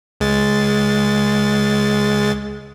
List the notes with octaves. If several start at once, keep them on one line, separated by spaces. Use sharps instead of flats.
C#2 G#3 A6